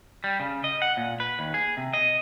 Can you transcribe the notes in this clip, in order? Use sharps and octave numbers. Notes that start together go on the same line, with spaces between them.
G3
C#3
D#5
F#5
A#2
B4
D#2
G#4
C3
D#5